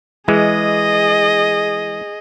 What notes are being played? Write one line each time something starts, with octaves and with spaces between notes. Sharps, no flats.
E3 G#3 G#4 D#5